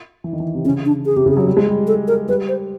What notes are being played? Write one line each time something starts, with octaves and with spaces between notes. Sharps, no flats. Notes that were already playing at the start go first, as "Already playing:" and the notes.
E3
D#3
E3
C3
C#3 C#4
D4
G#4
C3 G4
C#3 G#4
F#3
G3
G#3
G3
A4
A#4
G3 B4
C5